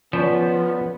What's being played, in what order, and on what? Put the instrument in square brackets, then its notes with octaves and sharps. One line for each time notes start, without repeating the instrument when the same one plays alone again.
[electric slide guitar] F3 [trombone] B3 [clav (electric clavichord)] C#4 [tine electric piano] D5 B5 B6